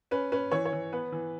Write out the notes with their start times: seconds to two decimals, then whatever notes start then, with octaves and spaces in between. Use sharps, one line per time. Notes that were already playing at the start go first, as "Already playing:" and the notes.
0.11 C#4 B4
0.32 C#4 B4
0.51 E3 C#5
0.65 C#5
0.73 E3
0.93 B3 B4
1.12 E3